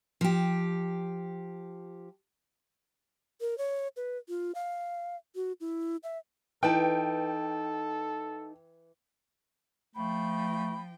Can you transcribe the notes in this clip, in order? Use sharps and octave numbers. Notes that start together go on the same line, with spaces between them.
F3 G4
A#4
C#5
B4
F4
F5
F#4
E4
E5
E3 D#4 A4 B4 G5 A5
F3 A3 G5 B5